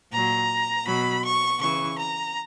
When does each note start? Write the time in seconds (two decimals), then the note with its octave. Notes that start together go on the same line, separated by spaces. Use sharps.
0.12 A#2 F#3 A#5
0.86 B2 F#3 B5
1.23 C#6
1.60 C#3 E3 C#6
1.98 A#5